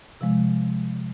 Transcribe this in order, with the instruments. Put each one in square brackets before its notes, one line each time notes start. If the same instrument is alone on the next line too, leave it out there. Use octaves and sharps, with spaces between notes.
[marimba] C3 F3 G#3